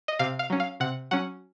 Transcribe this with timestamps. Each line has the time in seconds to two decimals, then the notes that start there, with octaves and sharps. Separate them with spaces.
0.08 D#5
0.19 C3 F5
0.39 F5
0.50 F#3 C#4
0.60 F5
0.80 C3 F#5
1.11 F#3 C#4 F#5